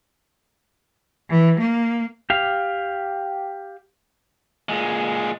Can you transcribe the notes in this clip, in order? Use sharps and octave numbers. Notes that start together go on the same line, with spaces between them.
E3
A#3
G4 F5
A#2 G#3